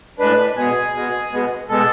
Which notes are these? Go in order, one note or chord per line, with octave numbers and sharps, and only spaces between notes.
A2 G#3 D4 B4
B2 G#3 B3 G#4
B2 G#3 B3
B2 G#3 B3
B2 G#3 B3 A4